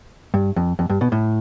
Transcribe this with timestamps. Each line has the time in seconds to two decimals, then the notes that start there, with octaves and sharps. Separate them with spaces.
0.34 G2
0.56 F2
0.79 F2
0.90 G2
1.01 B2
1.12 A2